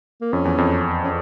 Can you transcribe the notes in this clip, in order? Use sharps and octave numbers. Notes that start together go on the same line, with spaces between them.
A#3
F2 C#4
E2
F2
C#4